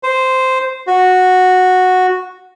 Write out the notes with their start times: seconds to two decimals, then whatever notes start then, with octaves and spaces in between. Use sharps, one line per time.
0.03 C5
0.87 F#4